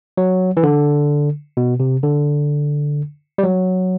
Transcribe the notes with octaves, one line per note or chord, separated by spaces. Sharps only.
F#3
E3
D3
B2
C3
D3
G3
F#3